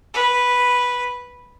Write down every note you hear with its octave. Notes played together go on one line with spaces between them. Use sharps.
B4